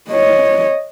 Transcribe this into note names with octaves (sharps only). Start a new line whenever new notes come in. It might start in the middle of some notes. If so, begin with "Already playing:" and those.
C#5 D#5